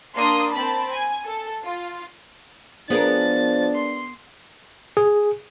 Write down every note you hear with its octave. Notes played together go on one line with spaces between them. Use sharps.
A#3 D4 C6 D#6
C4 A5 B5
G#5
A4
F4
F3 B3 D4 G#4 A#4 A6
C6
G#4